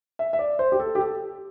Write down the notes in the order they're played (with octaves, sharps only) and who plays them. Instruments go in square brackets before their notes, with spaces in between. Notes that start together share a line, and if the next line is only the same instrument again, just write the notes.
[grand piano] E5
E5
D5
C5
G4
A4
G4
A4